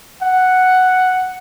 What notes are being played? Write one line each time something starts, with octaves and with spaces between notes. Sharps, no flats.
F#5